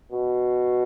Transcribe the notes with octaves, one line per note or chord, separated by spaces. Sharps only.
B2